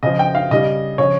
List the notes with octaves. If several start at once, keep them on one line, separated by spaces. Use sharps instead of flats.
C#3 F3 D#5
G5
F5
C#3 G3 D#5
C#3 F3 C#5